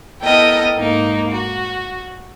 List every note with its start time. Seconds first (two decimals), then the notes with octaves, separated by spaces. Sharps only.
0.22 B3 E4 A4 A#4 D#5 G5
0.76 G#2 A#3 D#4
1.31 F#4